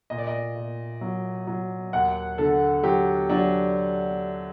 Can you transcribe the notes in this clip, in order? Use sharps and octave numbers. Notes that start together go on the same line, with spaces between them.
A#2 D#5
D5
D#5
A#2
F#3
F#3
D#2 F#5
D3 A4
F#3 G4
F#3 D4